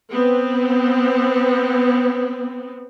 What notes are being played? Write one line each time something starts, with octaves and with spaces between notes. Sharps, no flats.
B3 C4